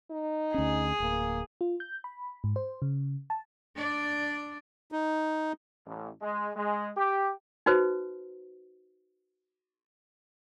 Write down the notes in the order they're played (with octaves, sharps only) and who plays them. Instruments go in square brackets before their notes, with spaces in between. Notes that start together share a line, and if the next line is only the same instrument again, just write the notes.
[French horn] D#4
[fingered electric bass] D2 C#4 [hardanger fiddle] G#4
[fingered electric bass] D1 [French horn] A#3
[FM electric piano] F4
G6
B5
G#2
C5
C#3
A5
[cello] D4 D5
[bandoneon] D#4
[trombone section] A1
G#3
G#3
G4
[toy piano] D#4 F#4 B4 C5